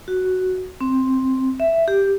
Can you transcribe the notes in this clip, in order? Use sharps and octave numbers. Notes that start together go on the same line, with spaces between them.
F#4
C4
E5
G4